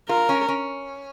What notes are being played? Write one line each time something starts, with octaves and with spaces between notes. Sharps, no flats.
F4 A#4
C#4
C#4